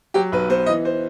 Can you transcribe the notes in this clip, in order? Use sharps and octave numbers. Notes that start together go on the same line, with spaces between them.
F#3 G4
B1 B4
B3 C5
E3 D#5
C5